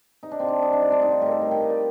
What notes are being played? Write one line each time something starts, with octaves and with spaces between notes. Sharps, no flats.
C3 D#4
D4
C3 C4
D4
G3 D#4
D4
G3 C4
D4
A2 D#4
F4
A2 G4
A4 A#4
G3 A#4
G5
G3 D#5
D5